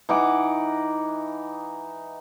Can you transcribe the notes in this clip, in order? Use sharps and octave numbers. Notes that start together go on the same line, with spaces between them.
E3 D#4 F#5 D6